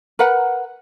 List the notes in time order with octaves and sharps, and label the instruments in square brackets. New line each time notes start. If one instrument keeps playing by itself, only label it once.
[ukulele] A#4 B4 F#5